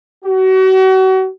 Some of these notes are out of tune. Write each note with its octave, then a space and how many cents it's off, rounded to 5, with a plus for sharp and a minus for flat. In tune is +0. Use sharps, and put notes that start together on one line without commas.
F#4 +35